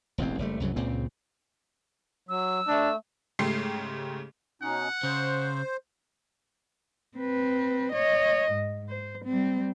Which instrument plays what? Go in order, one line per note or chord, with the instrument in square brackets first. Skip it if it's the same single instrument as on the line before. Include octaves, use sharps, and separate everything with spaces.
[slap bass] E1 A1 E2 C4
F#1 G3 A3
C2 F#2 C#3 F#3
C#2 A#2 C#3 C4
[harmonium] F#3 [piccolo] E6
[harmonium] A3 [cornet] D4
[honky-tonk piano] G#2 C#3 A3 G4 C6 C7
[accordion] B2 C#4 D#4 [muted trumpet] F#5
[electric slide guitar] C#3 [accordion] C5
[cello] C4 B4
C#5 D#5
G#2
C5
G3 C4